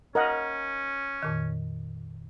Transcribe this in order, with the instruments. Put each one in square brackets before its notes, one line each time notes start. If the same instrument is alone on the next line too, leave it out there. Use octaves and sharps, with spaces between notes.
[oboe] C#4 [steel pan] A#4 D#5 F#5
[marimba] F2 A#2 D#3